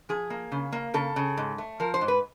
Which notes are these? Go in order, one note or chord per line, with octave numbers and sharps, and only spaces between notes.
F3 G#4
A#3
C#3
A#3
C#3 A4
C#3
G#2
A3
F3 A#4
C5
G#2
B4